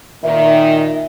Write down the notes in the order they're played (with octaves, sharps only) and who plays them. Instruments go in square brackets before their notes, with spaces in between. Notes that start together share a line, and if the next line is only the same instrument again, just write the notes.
[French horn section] A#2 D#3 [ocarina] E5